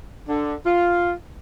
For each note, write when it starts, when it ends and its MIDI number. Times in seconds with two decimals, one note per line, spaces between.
0.28 0.55 50
0.66 1.11 65